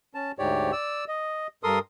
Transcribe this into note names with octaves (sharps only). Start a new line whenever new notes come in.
C#4 A5
D2 G#2 G4 C#5 D5
D5 E6
D#5
G2 A4 A#4 C6 D#6